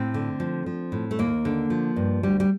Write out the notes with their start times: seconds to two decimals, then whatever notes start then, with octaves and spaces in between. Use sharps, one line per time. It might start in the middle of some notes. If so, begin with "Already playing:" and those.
Already playing: A2 C4
0.14 D3
0.40 F3
0.66 F3
0.92 A2
1.11 A3
1.19 D#2 A#3
1.45 D3
1.70 F3
1.96 G2
2.23 D2 G3
2.40 G3